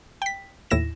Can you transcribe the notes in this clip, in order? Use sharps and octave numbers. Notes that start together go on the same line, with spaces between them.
G5 B6
D#2 A2 E4 A#6 E7